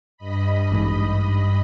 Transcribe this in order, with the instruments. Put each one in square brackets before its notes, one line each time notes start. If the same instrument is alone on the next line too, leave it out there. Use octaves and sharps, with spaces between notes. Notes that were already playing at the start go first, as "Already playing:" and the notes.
[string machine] G2 D#5 B5
[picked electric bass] A1 G#2